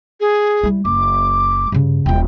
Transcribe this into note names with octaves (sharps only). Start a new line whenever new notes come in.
G#4
G3 E4
F#1 D6
G2 C#3
D#1 F4 G5